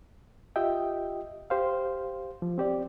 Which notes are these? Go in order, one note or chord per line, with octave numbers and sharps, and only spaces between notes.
F4 G4 D#5 E5 G5
G4 C5 F5
F3
C4 G4 D5